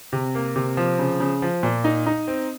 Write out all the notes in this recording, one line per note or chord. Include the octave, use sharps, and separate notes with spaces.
C3
A#3
C3
F3
C#3
C#3
F3
A#2
D#4
D#4
C4